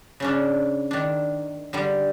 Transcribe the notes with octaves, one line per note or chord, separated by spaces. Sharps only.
C#3 C#4 D4
D#3 D4
D3 G3